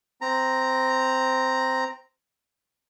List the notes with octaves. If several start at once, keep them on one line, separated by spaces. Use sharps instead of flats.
C4 A#5